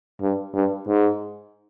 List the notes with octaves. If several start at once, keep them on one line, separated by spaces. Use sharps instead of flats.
G2
G2
G#2